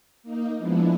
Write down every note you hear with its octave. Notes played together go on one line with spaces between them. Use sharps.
A#3 D#4
F3 G#3 B3 D4 E4